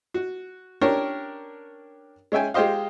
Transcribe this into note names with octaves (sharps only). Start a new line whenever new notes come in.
F#4
C#4 D4 G4 A#4 C#5
G#3 C#4 E5 G5 G#5
G#3 F4 G4 C5 D#5 F5